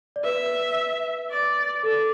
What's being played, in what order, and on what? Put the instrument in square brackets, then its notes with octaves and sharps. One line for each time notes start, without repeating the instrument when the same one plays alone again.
[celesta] D5
[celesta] B4 [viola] E5
[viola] D5
[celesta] A4 [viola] D5